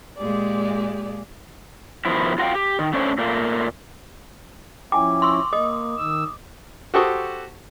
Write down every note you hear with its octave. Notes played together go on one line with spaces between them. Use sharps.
A#2 G#3 G4 G#4 D5
B2 D#3 F3 E4
F4 F#4 A4 F5 G5
G4
D#3
A3 C#4 D4 C5
A#2 A3 A#3
F3 C#4 E4 G5 G#5 D6
C6 C#6 E6
A#3 D#5 D#6
D#3 E6
F#4 G4 A4 C5 C#6 D#6